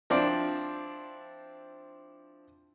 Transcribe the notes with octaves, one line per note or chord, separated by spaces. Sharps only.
F3 C4 D4 E4 D5